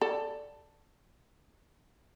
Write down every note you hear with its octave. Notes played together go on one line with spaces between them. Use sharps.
A4 D5